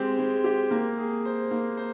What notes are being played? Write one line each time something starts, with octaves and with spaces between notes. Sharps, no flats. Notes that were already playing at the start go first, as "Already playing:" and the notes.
Already playing: G#3 C4 G4
G#3
G4
A#3
G#4
C5
A#3
C5